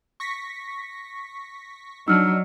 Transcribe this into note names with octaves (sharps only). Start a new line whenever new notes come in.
C#6 A#6 B6
F#3 D4 D#4 E6 F6